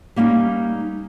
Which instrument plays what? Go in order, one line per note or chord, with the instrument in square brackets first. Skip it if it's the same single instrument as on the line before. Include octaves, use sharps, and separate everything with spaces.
[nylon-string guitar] G3 A#3 C#4 D#4